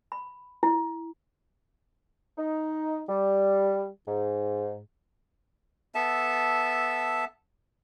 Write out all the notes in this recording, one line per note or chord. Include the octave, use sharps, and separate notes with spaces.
B5
E4
D#4
G3
G#2
B3 A4 E5 A5